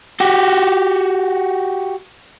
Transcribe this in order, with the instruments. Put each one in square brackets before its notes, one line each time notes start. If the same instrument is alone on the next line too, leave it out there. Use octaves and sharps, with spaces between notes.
[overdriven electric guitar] F#4 G4